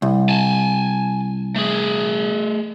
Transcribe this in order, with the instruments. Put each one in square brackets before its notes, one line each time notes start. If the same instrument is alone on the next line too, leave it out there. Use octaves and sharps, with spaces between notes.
[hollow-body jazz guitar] C2
[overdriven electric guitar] G#5 A5
A3 G#4